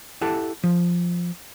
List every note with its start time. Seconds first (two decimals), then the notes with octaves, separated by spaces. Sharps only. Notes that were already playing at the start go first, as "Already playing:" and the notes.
0.21 E4 G4 A4 F#5 A5
0.64 F3